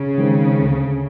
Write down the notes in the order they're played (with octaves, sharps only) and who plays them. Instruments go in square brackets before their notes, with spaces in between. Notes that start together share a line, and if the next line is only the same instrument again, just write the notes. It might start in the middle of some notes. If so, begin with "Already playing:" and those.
Already playing: [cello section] C#3
[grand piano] D#3 G#3 C4
D2